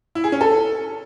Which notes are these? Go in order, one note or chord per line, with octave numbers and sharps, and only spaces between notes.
E4
G#4
C#4
A4